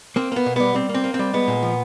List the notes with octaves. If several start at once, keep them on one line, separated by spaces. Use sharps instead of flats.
A#3 C4
A#3 B3
B2
G3 B3
G3 C4
A#3
C4
A#3
C4
G3
G#3 B3
A#2
F3